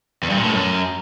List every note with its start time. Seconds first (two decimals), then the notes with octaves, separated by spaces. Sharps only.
0.23 E2
0.30 G2
0.37 A#2
0.44 A2
0.51 F#2